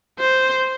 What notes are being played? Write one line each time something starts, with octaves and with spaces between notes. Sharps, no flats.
C5